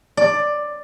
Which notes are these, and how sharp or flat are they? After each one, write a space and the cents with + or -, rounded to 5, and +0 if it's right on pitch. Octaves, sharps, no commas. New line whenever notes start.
D5 +10